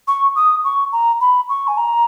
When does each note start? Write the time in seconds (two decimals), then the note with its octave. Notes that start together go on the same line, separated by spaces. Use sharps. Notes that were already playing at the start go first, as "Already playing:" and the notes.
0.07 C#6
0.35 D#6
0.64 C#6
0.92 A#5
1.21 B5
1.49 C#6
1.67 G#5
1.77 A#5